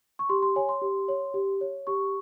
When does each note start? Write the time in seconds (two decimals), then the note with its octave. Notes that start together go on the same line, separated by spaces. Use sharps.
0.19 C#6
0.29 G4 C6
0.42 C6
0.56 C#5 G#5
0.69 C6
0.82 G4
1.08 C#5
1.34 G4
1.61 C#5
1.87 G4 C#6